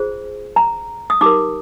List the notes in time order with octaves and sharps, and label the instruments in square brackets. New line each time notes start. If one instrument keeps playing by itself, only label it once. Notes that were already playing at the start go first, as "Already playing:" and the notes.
Already playing: [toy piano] F4 G#4 C5
A#5
D#6
D#4 G4 A#4 D6